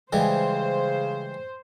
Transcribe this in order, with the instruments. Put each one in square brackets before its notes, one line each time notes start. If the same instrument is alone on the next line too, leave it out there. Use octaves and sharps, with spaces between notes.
[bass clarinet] C#3 [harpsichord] E3 G3 G#3 [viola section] C5